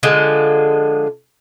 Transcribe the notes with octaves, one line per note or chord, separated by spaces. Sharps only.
D3 F3 G#3